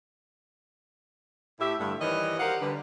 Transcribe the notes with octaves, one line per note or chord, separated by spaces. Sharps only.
A2 G4 E5
G2 D3 A3
D#3 E3 G3 B4 C#5 D#5
F#4 G4 A#4 C5 F5 F#5
D3 G3 B4